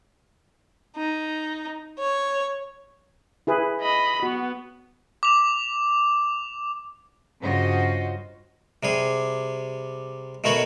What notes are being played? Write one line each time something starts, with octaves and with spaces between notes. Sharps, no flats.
D#4
C#5
E4 G#4 B4
D#5 B5
B3 F#4
D6 F7
G2 C#3 F4 F#4 C5 D#5
C3 G3 G#4
B2 D#3 A3 F#4 C#5 B5